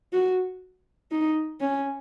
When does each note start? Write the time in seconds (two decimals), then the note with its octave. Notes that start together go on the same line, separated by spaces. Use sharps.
0.13 F#4
1.11 D#4
1.61 C#4